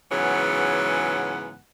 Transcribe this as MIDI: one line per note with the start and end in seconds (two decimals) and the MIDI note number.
0.12 1.57 44
0.12 1.57 49
0.12 1.57 52
0.12 1.57 54
0.12 1.57 59
0.12 1.57 78